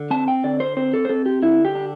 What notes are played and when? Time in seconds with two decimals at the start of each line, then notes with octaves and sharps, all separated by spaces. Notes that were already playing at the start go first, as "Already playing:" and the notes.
Already playing: D3
0.11 C4 A5
0.28 G5
0.44 D3 D5
0.60 C5
0.77 C4 C5
0.94 A4
1.05 C5
1.09 C4 A4
1.26 G4
1.43 D3 E4
1.65 G4
1.75 D4